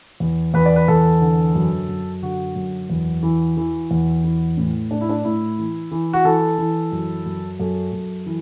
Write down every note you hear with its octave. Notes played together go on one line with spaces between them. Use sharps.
E2
E2 B4
D5
B4
E2 A4
D3
F#2
F#2
D3 F#4
F#2
E2
E3
E3
E2
E3
A2
A2 D4
E4
D4
A2 E4
E3
E3
F#4
E3 A4
E3
F#2
F#2
F#2 A4
F#2
E3